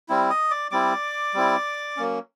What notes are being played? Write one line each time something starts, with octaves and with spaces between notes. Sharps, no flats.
G3 C4 E4
D#5 D#6
D5 D6
G3 C4 E4 D5 D6
G3 C4 E4
F#3 A#3 C#4